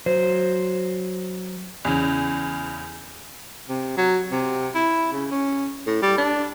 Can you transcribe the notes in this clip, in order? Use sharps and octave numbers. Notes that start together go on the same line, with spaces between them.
F#3 C5
E2 C#3
C3
F#3
C3
E4
C#3
C#4
A2
G3
D4